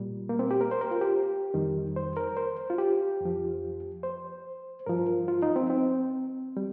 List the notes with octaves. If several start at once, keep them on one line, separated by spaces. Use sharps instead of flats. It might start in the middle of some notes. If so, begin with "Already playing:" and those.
Already playing: A#2 G3
A#3
C4
G4
A#4
C5
A#4
F4
G4
F2 D#3 G3
C5
A#4
C5
F4
G4
F2 F3
C5
G2 F3 A#4
F4
D#4
C4
C4
G3